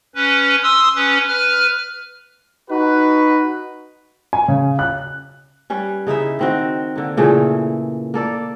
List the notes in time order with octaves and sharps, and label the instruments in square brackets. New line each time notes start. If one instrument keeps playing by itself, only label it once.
[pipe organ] C#4 B4
C6 D#6 E6
C#4 B4
B4 F6
[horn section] D#4 F#4 B4
[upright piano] G#5
C#3
F#6
[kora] G3 C#4 B4
C#3 D#4 E4 E5
D#3 C4 F#4
D3 A#3
A#2 C#3 E3 A3
A#3 A4 D5